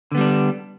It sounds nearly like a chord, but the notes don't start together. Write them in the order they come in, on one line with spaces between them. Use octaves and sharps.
D3 B3 G3 D4